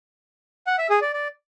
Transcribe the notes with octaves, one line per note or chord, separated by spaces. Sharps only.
F#5
E5
G#4
D5
D5